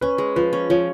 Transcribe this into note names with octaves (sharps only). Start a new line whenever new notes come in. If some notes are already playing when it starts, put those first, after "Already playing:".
C#4 B4
G#3
F3 B4
C#4
F3 C#5